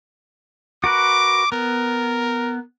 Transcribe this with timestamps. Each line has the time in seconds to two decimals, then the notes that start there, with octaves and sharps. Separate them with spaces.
0.84 F#4 A#4 B4 D6
1.52 B3 A#4